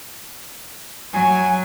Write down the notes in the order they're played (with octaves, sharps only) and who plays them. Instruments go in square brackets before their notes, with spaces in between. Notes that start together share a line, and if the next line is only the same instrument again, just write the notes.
[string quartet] F#3 [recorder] G#5